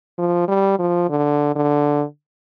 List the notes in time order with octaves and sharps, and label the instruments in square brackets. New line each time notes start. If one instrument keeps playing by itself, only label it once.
[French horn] F3
G3
F3
D3
D3